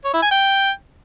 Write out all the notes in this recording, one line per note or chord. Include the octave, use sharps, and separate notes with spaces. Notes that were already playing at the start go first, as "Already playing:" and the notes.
C#5
E4
G#5
G5